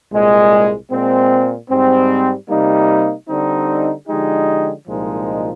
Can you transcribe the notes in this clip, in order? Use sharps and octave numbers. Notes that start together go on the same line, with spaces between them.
C2 A#2 G#3
A#2 G#3 C4
G#2 G3 C4
C3 G3 A#3 D#4
D3 G3 C4 D#4
D3 F3 G#3 D#4 G4
C2 A#2 F3 G#3 D#4